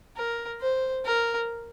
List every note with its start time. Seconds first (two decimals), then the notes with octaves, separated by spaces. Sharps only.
0.16 A#4
0.61 C5
1.05 A#4